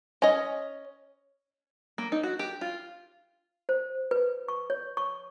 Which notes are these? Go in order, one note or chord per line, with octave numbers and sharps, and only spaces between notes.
C#4 D#5
A#3
D#4
F#4
G4
F4
C5
B4
C#6
C#5
C#6